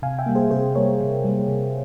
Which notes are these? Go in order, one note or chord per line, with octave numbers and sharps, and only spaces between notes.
C3 F5 G#5
E5 G5
G3 A#3
G#4 C5
C3 G#4 C5
G3 A#3 A#4 C#5
C3
G3 A#3
C3